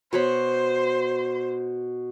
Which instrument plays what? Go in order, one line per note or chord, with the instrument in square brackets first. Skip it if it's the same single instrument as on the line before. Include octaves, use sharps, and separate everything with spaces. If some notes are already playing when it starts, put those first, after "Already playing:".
[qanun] B2 C#5 B5 [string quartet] C5